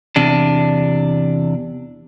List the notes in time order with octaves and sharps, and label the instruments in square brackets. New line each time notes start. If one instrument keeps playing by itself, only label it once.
[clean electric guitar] E2 C3 D4